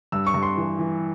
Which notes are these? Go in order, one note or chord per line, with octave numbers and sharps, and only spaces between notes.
G2 E6
C#6
G2
C6
E3
E3